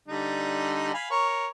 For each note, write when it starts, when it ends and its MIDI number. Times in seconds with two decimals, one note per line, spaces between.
0.08 0.90 50
0.08 0.90 55
0.08 0.90 63
0.94 1.10 77
0.94 1.10 80
0.94 1.10 83
1.11 1.47 70
1.11 1.47 73